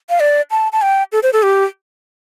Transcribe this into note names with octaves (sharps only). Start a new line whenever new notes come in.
F5
D5
A5
A5
G5
A4
C5
A4
G4